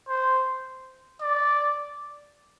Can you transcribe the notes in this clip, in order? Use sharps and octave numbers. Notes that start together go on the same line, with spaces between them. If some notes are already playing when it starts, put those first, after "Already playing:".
C5
D5